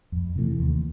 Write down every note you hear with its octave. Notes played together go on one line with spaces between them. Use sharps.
F2
C3 E3 A3
D#2